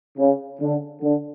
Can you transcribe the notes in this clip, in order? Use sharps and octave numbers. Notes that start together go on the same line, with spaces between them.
C#3
D3
D3